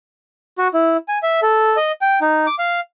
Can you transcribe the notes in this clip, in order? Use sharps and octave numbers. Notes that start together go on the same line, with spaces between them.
F#4
E4
G#5
E5
A4
D#5
G5
D#4
D6
F5